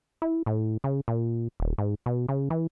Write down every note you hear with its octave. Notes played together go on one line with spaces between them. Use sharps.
E4
A2
C#3
A#2
D#1
G#2
B2
C#3
E3